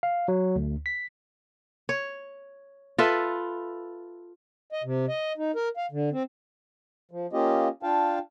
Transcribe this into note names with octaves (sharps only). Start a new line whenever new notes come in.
F5
F#3
D2
B6
C#5
F4 A4 B4 E5
D#5
C3
D#5
D#4
A#4
F5
D3
C4
F3
A#3 C#4 F4 G4 D#5
D4 F4 F5 G5 A5